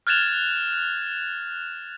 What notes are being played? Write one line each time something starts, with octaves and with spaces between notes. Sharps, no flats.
F6 F#6 G#6 A6 E7 F7